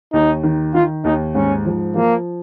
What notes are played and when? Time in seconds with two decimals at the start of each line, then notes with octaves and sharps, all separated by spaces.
0.13 D#2 D#4
0.43 D#3
0.74 D#3 F4
1.04 D#2 D#4
1.35 G#2 C#4
1.65 F3
1.96 F3 A#3